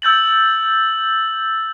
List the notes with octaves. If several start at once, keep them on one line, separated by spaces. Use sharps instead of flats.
E6 G6 A6 F#7